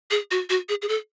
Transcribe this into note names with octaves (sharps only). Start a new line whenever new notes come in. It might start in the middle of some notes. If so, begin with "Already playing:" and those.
G#4
F#4
F#4
G#4
G#4
A4